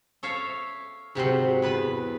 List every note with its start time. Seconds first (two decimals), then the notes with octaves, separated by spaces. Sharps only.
0.23 A4 C#5 E5 F5
1.15 G#2 C3 F#3 C6
1.62 E2 B4 A5 B5